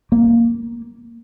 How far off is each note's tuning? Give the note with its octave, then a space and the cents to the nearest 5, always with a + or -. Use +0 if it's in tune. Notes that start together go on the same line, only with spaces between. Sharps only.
A#3 +0